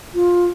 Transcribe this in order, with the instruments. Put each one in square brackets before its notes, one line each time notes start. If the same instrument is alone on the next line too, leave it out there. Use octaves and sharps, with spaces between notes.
[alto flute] F4